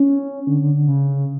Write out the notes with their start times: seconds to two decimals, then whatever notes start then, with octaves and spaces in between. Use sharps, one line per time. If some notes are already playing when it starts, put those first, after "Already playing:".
Already playing: C#4
0.47 D3
0.61 D3
0.74 D3
0.88 C#3